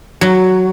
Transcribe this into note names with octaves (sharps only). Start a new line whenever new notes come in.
F#3